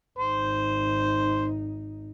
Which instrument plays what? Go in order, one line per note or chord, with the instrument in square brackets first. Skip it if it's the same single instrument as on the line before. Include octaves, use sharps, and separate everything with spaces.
[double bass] G#1 D#4 [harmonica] C5